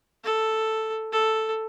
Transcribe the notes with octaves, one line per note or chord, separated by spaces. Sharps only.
A4
A4